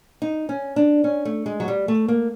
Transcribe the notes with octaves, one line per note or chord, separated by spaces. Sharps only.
D#4
C#4
D4
C#4
A3
G#3
F#3
G3
A3
A#3